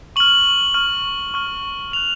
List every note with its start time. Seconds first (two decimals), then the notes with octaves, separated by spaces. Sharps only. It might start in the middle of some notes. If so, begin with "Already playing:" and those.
0.16 C#6 F6 F#7
0.74 C#6 F6
1.34 C#6 F6
1.92 C#6 F#6 F7